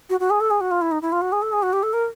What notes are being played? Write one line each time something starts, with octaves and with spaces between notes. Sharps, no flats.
F#4
F#4
G#4
A4
G#4
F#4
F4
E4
D#4
E4
F4
F#4
G#4
A4
G#4
F#4
G4
A4
A#4